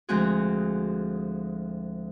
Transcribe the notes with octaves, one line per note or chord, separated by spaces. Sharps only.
D2 F3 G#3 C4 F#4 G#4